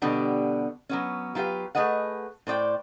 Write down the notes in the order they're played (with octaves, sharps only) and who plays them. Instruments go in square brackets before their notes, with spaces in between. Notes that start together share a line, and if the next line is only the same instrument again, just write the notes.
[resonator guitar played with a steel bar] B2 D3 G3 B3 D4 G4
F#3 B3 C#4
F#3 F4 G4 B4 F5
A3 G#4 B4 D#5 F#5
A2 C5 D5 G5